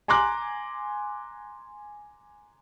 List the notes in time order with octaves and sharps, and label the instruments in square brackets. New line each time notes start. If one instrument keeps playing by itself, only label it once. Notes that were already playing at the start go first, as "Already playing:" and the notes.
[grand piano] G#5 A#5 C6 D6 F#6